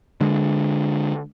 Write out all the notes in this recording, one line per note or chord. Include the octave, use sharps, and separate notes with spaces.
D3 G#3